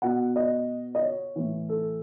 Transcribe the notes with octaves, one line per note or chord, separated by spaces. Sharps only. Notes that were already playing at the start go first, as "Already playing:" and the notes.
B2 F#5
D#5
D#5
C#5
A2 E3
A4